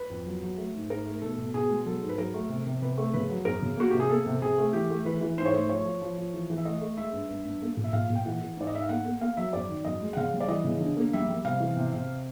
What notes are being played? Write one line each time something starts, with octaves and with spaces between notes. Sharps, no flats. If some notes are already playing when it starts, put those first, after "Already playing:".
Already playing: B4
F2
F#3
F#3
A3
G#2
G#2 A#4
A3
B2 A4
B2
B2 G#4
G#3
F#3 A4
G#2
B4
F#3 A#4
A3
C3
C3
C3 B4
A3
C#3 B4
F#3
F#2 A#4
C#3
A#3 F#4
C3 G4
G#4
A#3 A4
C3
C3 G#4
A3
E3 G4
A3
E3 B4
E3
G#2 C5
C#5
A3 C5
F3 C#5
F3
F3
F3
E3
E3
E5
A3 D#5
A3
G#3 E5
G2
G2
G2
A#3
A#2
E5
A#2 F5
A#2
G5
E3 F#5
E3
G#2 D5
D#5
G#2 E5
F5
A#3 F#5
A#3
A#3 F5
F#3 E5
F#2 D5
D#3
F#2 D#5
G#3
F#5
C#3 F5
G3
D5
E3 D#5
C#3
D3
A#3
G3 E5
G3
C3 F5
E3
C3
C3